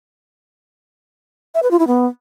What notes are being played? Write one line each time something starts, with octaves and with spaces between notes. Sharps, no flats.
E5
B4
F4
E4
B3